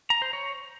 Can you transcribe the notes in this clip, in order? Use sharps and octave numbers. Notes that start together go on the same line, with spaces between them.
A#5
C5
C#5